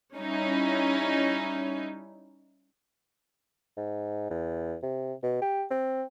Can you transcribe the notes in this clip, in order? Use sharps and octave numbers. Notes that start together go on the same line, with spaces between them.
G3 C#4 D#4 E4
G#2
E2
C3
B2
G4
C4